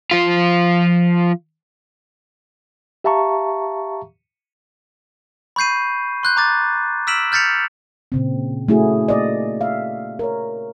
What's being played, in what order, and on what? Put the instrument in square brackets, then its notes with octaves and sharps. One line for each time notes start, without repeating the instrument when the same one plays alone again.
[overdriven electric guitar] F3 F4
[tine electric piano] G4 E5 F5 A5 A#5 C#6
[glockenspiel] B5 C#6 G6 C7 D#7
C6 F#6 G6
A#5 D6 A6
E6 F6 B6 D7 E7 F#7
F6 G6 A6 B6 C#7 F7
[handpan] A#2 C#3 C4
A3 C#4 E4 F#4 G#4
A#3 D5 D#5
E5 F5
A#4 C#5